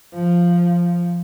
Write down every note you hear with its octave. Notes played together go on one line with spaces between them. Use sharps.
F3